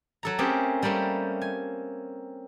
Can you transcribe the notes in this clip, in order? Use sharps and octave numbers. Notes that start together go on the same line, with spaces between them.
F#3 A4 A#5
A3 C4 C#4 G4 G#4 A#4
G3 A3 A#3 C4 C#4
G#5